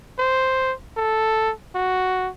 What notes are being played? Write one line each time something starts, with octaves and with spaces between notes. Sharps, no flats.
C5
A4
F#4